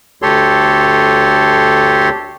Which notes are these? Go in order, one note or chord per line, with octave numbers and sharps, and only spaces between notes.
D2 G4 A4 C#5 C6